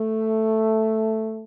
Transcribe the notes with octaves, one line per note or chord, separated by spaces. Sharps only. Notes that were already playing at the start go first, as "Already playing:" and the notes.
Already playing: A3